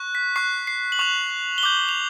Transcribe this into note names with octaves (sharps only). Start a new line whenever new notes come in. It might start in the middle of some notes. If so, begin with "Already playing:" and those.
Already playing: C#6 F#6
B6
C#6 F#6 C7
C7
F#7
C#6 F#6 F7
G7
D6 G6 F#7
F7